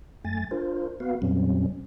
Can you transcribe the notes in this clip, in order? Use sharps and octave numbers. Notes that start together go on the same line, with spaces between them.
F#2 A3 G#5 A6
D4 F4 A#4 C5
B3 F#4 B4 F5
F2 A#2 F#3 G3 C4 C#4